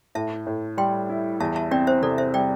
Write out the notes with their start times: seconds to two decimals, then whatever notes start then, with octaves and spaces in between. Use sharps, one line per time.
0.15 A2 E5 A5
0.47 A2
0.77 G3 G5 C6
1.10 E4
1.40 E2 E5 A5
1.56 E5 A5
1.71 C4 D5 G5
1.87 C5 E5
2.02 C3 A4 D5
2.18 C5 E5
2.34 G3 D5 G5